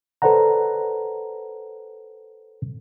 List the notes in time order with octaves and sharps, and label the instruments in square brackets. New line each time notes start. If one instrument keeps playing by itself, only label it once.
[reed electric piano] A4 B4 C5 D5 F#5 A#5